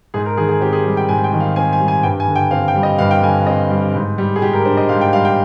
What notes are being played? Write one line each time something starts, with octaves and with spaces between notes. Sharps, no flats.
G#2 G#4
A#4
D#3 G#4
G#4
C4 G4
G#4
G3
G5
G#2 G#5
G5
D#3
F5
C4 G#5
G#5
G3
G#5
G2 G5
G#5
D3
G5
C4 F5
G5
G3
D#5
G2 F5
G5
D3 G#5
C4 D#5
G3
G#2
G3
G#4
G#2 G4
A#4
D4 C5
D#5
G#2 F5
G5
G3 F5
G5